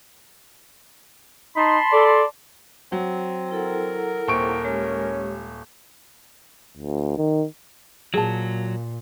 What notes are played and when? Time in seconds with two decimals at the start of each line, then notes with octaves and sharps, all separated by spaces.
1.56 D#4 A5 B5 C6
1.92 A4 D5
2.92 F#3 C4
3.51 E4 A4 A#4 F#5
4.28 D#1 C3 C#6 D7
4.65 G#3 C#4 G4
6.77 D2
7.18 D#3
8.14 A#2 F#3 G#4 A5